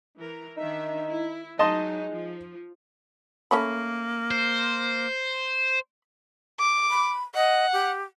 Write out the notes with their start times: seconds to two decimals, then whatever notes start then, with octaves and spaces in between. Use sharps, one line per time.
0.18 E3 A#4
0.57 D#3 D4 D#4 E5
1.07 E4
1.59 F#3 G#3 D#4 D#5 A5 C6
2.11 F3
3.51 A3 A#3 C#4 B5
4.31 C5
6.59 D6
6.90 B5
7.35 D#5 F#5
7.73 G4